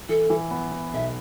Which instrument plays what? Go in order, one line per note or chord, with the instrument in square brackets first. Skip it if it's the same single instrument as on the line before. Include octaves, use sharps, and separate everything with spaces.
[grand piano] E3 [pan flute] A4
[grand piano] E3
B3
B3
[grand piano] B1 [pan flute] E5